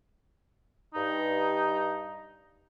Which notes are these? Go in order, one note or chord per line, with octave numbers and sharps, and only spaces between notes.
G2 D#4